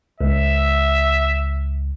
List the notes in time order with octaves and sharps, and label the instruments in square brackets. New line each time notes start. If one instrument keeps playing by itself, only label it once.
[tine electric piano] C#2 [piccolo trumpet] E5